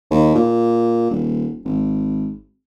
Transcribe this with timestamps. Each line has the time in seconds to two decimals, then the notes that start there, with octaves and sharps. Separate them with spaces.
0.10 D#2
0.35 A#2
1.11 D#1
1.65 G#1